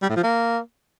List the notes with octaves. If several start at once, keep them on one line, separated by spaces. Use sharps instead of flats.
G3
A2
F3
A#3